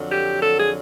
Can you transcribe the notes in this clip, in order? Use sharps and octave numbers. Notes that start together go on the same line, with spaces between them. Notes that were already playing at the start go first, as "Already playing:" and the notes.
Already playing: F2 D3 F#3
G4
A4
G#4